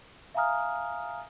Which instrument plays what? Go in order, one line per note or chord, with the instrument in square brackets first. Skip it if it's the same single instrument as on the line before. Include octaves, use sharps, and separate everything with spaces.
[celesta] E5 F5 G#5 A#5 D#6 F6